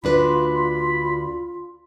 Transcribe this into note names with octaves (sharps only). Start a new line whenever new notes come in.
D2 D4 F4 B4 B5